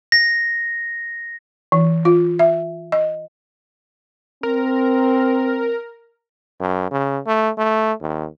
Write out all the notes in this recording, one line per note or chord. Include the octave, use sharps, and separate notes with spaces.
A#6
E3
F4
E5
D#5
C4 A#4
F#2
C#3
A3
A3
D#2